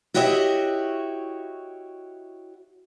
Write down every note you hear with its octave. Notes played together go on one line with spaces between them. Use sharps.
E4 F#4 G4 C#5 D#5 E5